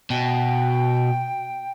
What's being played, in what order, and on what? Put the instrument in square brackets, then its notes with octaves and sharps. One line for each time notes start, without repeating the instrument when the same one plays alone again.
[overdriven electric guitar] B2 [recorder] G5